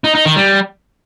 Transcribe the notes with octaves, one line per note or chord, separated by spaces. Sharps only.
D#4
D#4
D#3
G3